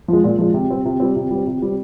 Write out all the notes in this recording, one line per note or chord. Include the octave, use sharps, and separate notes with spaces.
F3 G#3
A#2
F3 G#3
C3
G3 C4
C3
G3 C4
C3
G3 C4
C3
G3 C4